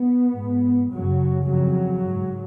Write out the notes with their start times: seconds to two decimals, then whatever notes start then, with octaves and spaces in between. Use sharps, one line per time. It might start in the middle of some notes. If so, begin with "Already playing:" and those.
Already playing: B3
0.33 G#2
0.90 F#2 C#3 F#3
1.48 F2 C#3 F#3
2.06 G#2